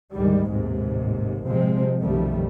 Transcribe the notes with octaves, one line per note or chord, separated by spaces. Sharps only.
D2 G#2 D#3 G3 G#3
A1 D#2 G#2 C3
C3 F3 G#3 C4
B1 F#2 D#3 F3 G3 A3